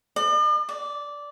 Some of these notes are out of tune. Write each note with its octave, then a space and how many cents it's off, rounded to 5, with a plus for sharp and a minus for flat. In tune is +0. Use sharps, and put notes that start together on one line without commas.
D5 +45
D5 -10